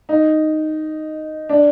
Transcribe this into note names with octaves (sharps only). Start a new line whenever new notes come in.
D#4
D4